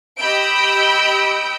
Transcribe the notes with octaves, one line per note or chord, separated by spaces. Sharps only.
G4 D#5 B5 E6 G6 D7